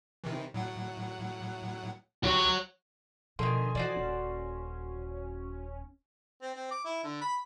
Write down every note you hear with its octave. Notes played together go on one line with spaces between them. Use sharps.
C3 D#3 E3
A2 F#3 F#5
C#2 F#4 G4 C#5 A#6
B2 D3 D#3 F3 A4 D#5 G#5 C6
E3 F#4 C5 D5
D#1 C#4
C4
C4
D6
E4
D3
B5